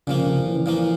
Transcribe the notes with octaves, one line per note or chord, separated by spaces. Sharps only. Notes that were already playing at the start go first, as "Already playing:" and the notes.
A#2 C#3 F3 A#3
C#3
E3
A#2 F3 A#3